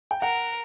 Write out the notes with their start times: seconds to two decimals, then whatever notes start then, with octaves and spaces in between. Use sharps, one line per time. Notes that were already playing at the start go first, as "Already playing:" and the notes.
0.11 G5
0.22 A#4 F#5